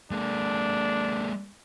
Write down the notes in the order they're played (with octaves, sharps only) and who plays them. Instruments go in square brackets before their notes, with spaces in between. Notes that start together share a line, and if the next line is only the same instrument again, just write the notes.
[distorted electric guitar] G#3 A#3 [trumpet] D4